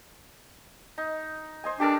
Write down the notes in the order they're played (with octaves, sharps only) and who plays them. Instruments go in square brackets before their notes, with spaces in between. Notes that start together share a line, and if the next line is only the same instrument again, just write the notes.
[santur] D#4
C5 D#5 G#5
[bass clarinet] D4 [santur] G4 A4 A#4